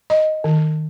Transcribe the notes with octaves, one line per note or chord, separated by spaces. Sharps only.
D#5
D#3